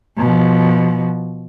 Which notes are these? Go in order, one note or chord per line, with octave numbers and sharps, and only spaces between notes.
B2 F3